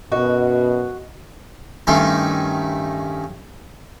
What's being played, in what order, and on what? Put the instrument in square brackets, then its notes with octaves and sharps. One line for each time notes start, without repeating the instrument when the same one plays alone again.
[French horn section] F#2 B2 [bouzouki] F#4 [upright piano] D#5
[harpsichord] G2 D#3 A3 C#4 D#4 C6